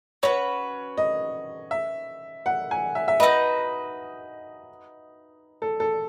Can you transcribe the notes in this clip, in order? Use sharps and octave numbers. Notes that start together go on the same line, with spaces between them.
C#4 F#4 B4 C#5
D#5
E5
F#5
G#5
E5
E5
D#4 F#4 B4 D#5
A4
A4